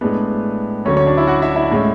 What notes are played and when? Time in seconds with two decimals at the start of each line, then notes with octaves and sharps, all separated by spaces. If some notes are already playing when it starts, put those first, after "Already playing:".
0.01 A2 G#3 B3 D4 B4
0.85 D2 D3 F#3 A3 C#4 C#5
0.97 C#4 C#5
1.06 D4 D5
1.17 E4 E5
1.27 F#4 F#5
1.42 E4 E5
1.56 E4 E5
1.71 A2 G#3 C#4